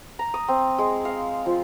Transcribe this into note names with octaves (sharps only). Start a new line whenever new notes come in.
A#5
D#6
C4
G#3
F5
F3